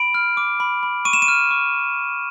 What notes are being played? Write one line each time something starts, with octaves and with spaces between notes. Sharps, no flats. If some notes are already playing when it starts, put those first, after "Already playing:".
Already playing: B5 D7
F6
D6
B5
B5
C#6 D#7
E7
D#7
F6
C#6